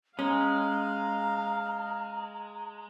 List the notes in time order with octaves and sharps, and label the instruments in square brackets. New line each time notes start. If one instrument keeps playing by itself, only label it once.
[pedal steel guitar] G#3 [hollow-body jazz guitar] C#4 [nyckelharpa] F5 [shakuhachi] A#5